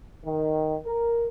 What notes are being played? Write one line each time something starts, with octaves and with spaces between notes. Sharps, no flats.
D#3
A#4